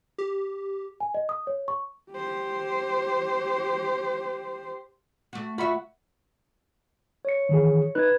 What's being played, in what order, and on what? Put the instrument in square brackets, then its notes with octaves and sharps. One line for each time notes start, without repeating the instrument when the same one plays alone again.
[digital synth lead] G4
[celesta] G#5
D#5
D#6
C#5
C#6
[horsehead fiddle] G4 C5
[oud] A3 F#4
[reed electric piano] F4 B5 C#6 [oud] F#4 E5
[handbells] C#5 C#7
[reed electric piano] D#3 E3 G#4
[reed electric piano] D#4 F#6 [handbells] B4 G#6